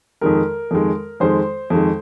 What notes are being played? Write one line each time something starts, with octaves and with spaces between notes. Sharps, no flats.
F2 D#3 G#3 A#4
F2 D#3 G#3
F2 D#3 G#3 C5
F2 D#3 G#3